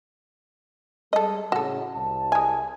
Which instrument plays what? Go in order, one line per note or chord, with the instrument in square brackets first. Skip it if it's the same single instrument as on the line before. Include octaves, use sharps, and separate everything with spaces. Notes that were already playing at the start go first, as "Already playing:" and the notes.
[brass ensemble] G3 G#3 [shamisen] A4 D#5
[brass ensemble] A2 C#3 [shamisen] F#4 A4
[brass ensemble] C2 A5
[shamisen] G#3 G#5